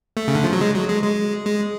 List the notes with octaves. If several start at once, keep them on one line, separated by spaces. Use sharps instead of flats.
A3
C#3
D3
F3
F#3
G#3
F#3
G#3
G#3
G#3